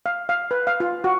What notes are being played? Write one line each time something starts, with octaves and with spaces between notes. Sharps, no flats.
F5
F5
B4
F5
F4
F#4